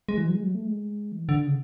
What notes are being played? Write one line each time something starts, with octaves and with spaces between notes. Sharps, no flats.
G#3
E3
F#3
G#3
F#3
A3
G#3
E3
D3
C#3